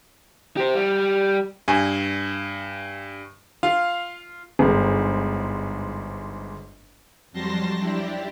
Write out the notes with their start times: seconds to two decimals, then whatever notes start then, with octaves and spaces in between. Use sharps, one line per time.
0.57 G4 C5
0.75 G3
1.68 G2 G#5
3.63 F4 F5
4.59 G1 G#2
7.32 F2 F#3 G3 A5 C6 A#6
7.79 D4 E4 G4